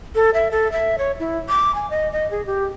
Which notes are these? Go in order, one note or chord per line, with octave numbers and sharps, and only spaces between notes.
A4
E5
A4
E5
C#5
E4
D6
G#5
D#5
D#5
G#4
G4